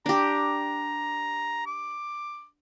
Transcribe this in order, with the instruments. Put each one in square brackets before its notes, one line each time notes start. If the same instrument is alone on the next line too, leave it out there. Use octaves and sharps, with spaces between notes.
[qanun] D4 G4 [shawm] A#5
[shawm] D6